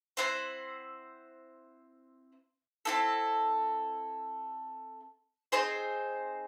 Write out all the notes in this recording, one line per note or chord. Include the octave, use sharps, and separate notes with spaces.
C4 E4 C5 F#5
C4 E4 A4
C4 D#4 G#4 C5